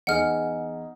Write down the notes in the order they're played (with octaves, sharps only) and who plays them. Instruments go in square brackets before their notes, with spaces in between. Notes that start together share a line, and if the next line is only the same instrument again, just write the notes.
[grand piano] E2 D#4 G#4 [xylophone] F#5 F6